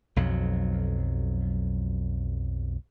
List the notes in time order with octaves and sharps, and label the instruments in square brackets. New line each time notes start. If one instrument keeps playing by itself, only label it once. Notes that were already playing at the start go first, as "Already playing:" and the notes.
[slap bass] B1 F2 F#3